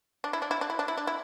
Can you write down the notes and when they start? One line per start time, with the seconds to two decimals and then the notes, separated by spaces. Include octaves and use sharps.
0.24 D4
0.33 E4
0.42 D4
0.51 E4
0.61 D4
0.70 E4
0.79 D4
0.88 E4
0.97 D4
1.07 E4